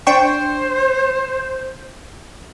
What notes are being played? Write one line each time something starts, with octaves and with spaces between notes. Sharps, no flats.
D4 C5 G5 C#6